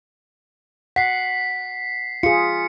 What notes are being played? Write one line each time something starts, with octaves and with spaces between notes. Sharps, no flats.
F#5 B6 C7
F4 G#4 C#7